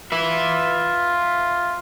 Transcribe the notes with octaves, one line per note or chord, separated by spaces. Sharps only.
F4 B4 E5